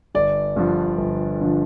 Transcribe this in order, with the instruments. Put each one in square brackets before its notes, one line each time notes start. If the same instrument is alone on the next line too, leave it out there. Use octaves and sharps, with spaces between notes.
[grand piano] G1 D5
G2 D3 F3
G1
D3 F3